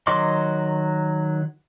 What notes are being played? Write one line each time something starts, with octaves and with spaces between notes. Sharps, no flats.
D#3 F#3 D#5 C6 D6